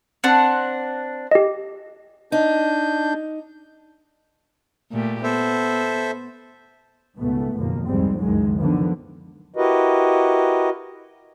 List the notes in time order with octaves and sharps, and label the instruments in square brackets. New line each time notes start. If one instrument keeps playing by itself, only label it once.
[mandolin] C4 D4 F#5
[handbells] G4 D#5
[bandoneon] D4 G6 [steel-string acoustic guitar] D#4
[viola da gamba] A#2 A3 G4
[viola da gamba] B3 [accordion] A4 C5 E5
[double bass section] C#2 G#2 B2 A3 B3
F#1 D#2 B2 F3 A#3
C2 F2 G#2 G3 G#3 C4
C#2 F#2 D#3 E3 F#3 G#3
D3 D#3 F3 B3
[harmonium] E4 F#4 G4 A#4 B4 D#5